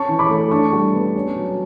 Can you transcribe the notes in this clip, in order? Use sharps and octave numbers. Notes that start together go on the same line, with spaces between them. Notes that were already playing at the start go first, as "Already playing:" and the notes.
Already playing: C#4 A5 C#6
E3
B5 D6
A3
D4 A5 C#6
G3
B3
C#4
F#3